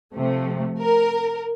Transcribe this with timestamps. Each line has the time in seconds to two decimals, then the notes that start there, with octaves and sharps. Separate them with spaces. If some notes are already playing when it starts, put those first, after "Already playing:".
0.16 C3 F3 A3
0.80 A#4